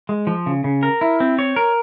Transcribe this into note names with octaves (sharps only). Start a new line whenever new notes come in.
G#3
F3
C#3
C#3
A#4
E4
C4
C#5
A#4